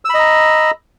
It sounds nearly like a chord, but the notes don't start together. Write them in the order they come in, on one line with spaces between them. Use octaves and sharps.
E6 B5 D#5 A#5